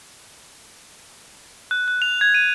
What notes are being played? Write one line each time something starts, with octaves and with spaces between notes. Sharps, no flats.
F#6
F#6
F7
G#6
D#7